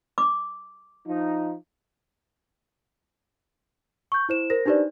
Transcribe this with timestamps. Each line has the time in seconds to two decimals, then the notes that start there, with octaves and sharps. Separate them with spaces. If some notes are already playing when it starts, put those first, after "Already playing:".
0.18 D6
1.07 F3 D#4
4.12 C#6 G6
4.29 E4 C5 E7
4.50 A#4 C5 A#6
4.66 D4 D#4 G4 B4 C5 D5